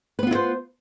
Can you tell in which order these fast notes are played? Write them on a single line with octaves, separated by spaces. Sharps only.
B4 B3 F4 E4 C5